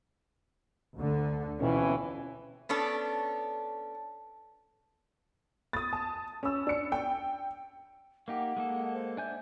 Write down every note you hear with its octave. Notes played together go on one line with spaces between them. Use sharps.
D2 D3
F2 B2 E3 C#4
B3 C#4 D4 A4
D#6 A6
A5
C#4 E6
D4 C#7
G5
A#3 D#4 G4 F#5
G#3 A#3 A4
C5
D4 E5 G#5 G6